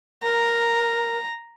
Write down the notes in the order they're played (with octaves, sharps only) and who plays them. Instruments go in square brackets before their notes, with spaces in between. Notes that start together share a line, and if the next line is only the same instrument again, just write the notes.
[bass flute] A#4 [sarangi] A#5